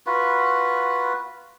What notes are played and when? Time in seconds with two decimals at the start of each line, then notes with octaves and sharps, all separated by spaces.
0.06 F4 F#4 B4